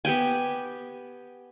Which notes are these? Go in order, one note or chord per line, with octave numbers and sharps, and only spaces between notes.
B3 G4 G5 G#5